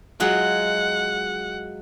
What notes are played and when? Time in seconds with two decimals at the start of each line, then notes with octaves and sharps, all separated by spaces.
0.20 F#3 G#3 F4 F#5